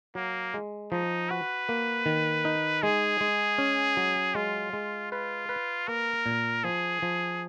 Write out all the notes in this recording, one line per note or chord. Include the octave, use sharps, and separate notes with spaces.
F#3 A#3
G#3
F3 D#4
F#4 B4
A#3
D#3
D#4
G#3 G#4
G#3
C#4
F#3
G#3 F4
G#3
F4 B4
B4
A#3 A#4
A#2
F3 G#4
F3